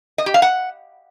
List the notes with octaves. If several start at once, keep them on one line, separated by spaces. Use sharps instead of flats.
D#5
G4
F5
F#5